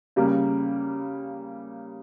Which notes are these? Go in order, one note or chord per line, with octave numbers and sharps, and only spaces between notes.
C#3 G3 A#3